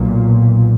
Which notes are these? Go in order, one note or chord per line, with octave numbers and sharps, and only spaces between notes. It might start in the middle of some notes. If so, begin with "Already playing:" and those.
Already playing: B1 A#2